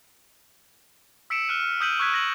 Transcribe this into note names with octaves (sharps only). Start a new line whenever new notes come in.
E6 B6 C#7 D7 E7
F6 F#6 D#7
F6
D#6 E6 G6 B6 D#7 F#7
C#6 E6 F#6 G#6 B6
A#6 F#7